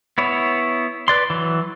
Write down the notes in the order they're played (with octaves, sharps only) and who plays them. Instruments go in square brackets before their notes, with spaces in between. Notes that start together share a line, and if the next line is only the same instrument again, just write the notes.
[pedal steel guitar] B3 E4 C#5
B4 D5 C6
E3 F#3